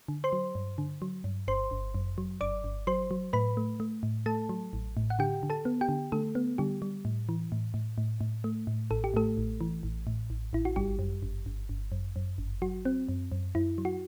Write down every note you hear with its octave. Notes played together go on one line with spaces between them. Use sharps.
D3
C5 C6
F#3
G2
D3
F#3
G2
G1 C5 C6
G1
F#2
F#3
G1 D5 D6
G1
F#3 C5 C6
F#3
A2 B4 B5
A3
A3
A2
A3 A4 A5
F#3
A1
A2
F#5
D3 G4 G5
D3
A4 A5
B3
G4 G5
D3
D3 A3 A4
B3
D3 G3 G4
G3
A2
E3
A2
A2
A2
A2
A3
A2
A1 A4
G4
A2 A3 A4
A1
E3
A1
A2
A1
A1 E4
F#4
G1 G3 G4
F#2
G1
G1
G1
F#2
F#2
G1
F#3 F#4
C4
F#2
F#2
F#2 E4
F#3
F#4